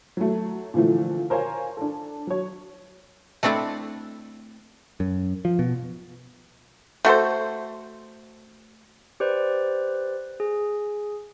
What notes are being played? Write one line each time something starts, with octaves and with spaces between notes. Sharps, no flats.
F#3 A3
A#2 D3 E3 F3 A3
A#4 C5 C#5 F5 G#5
D4 A4
F#3 C#5
A3 C4 D4 E4 A4
F#2
F3
B2
A3 F#4 A4 C5
G4 B4 C5 D5
G#4